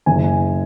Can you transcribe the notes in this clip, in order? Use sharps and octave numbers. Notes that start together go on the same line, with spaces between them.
F#1 G#5